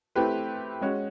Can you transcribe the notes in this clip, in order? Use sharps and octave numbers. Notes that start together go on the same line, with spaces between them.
A3 C4 E4 G4 B4
G#3 C#4 F#4